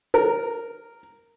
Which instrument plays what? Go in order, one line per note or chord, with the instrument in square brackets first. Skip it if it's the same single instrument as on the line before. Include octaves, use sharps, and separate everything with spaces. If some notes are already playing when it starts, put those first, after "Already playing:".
[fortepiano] A#4